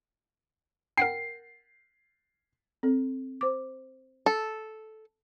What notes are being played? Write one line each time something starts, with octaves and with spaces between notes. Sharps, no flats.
A#4 F#5 G5 C7
C4 A4
C5 D6
A4